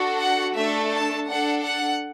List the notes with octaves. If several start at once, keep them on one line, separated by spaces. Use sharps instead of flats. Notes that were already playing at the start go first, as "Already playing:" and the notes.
Already playing: D4 F#4 A4
F#5
A3 D4 A4 E5
A5
D4 A4 F#5
F#5